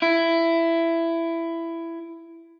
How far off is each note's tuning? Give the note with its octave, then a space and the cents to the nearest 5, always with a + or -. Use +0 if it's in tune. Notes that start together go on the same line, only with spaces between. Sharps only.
E4 +15